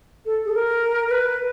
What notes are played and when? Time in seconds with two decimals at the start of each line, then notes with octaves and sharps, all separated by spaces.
0.26 A4
0.45 G#4
0.50 A4
0.55 A#4
1.07 A#4
1.11 B4